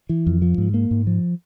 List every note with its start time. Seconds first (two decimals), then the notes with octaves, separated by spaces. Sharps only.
0.09 E3
0.27 F2
0.42 F3
0.58 G#2
0.74 A#3
0.91 G#2
1.07 F3